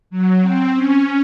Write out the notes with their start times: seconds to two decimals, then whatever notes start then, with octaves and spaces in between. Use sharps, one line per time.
0.10 F#3
0.42 C4
0.75 C#4